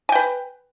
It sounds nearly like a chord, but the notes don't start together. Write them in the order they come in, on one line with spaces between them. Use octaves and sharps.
G#5 G5 B4